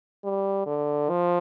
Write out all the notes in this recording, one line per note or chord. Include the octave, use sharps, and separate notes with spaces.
G3
D3
F3